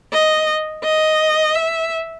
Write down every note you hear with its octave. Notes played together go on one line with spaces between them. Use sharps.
D#5
D#5
E5